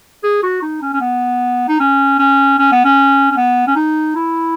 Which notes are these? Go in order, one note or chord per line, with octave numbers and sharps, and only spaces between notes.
G#4
F#4
D#4
C#4
C#4
B3
D#4
C#4
C#4
C#4
B3
C#4
C#4
B3
C#4
D#4
E4